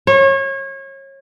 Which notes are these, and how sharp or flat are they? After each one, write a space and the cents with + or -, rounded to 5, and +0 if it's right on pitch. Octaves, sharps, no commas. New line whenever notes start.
C#5 -30